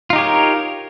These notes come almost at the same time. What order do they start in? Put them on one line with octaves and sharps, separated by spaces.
F4 D#4 G4 C#5 A#4